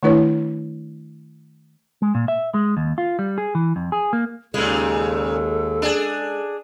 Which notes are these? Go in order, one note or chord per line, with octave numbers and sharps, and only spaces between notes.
D#3 A3 D4 E4 B4 C#5
G#3
A#2
E5
G#3
D#2
F4
G3
G#4
E3
F2
G#4
A#3
D#2 A#2 C#3 G#3 A4
D4 G#4